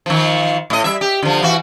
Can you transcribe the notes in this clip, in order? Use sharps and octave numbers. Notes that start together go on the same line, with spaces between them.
D#3 F3
A2 D#5
G3 E5
G4
D3 F3
E3 F#4